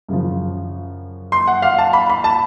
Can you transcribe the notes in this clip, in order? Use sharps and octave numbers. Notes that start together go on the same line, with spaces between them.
F#2 C#3 F3
C6
F#5
F5
A5
B5
B5
A5